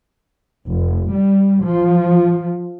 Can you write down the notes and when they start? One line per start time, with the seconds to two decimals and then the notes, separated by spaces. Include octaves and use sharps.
0.67 F1
1.12 G3
1.63 F3